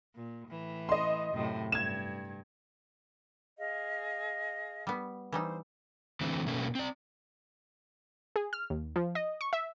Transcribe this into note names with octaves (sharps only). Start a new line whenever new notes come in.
A#2
A2 E3
D#5 C6
F#2 A2 C3
G2 G#6 E7
G#4 D#5 F5
G3 B3
E3 G3 D#4 C5
D3 E3 A3 C4
B2 A3 A#3 C#4
C4 D5
G#4
F6
D#2
F3
D#5
C#6
E5